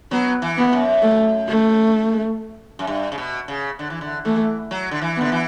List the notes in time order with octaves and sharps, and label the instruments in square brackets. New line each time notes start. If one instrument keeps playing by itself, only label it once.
[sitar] F#3 [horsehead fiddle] B3
[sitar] E3
[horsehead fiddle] B3
[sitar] F#2
[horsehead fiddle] A3
A3
[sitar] F#2
G2
C#3
B2
C#3
D3
E3
D3
[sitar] E3 [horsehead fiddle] A3
[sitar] F#3
D3
E3
[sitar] D3 [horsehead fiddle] B3
[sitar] E3